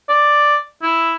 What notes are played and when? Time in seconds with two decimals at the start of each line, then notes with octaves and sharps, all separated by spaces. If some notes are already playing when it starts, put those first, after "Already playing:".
0.09 D5
0.83 E4